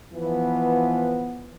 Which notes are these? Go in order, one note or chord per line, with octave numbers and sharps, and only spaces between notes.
E3 F3 B3